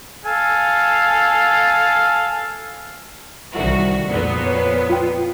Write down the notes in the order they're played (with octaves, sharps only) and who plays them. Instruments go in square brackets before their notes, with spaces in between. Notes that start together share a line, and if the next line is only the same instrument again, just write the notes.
[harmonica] A4 F5 G#5
[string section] C2 D#3 F#4 [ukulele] A4 D5 E5
[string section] F2 A#2 B3
[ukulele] C#5
F4 G5